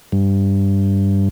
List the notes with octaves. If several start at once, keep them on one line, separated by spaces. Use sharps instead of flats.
G2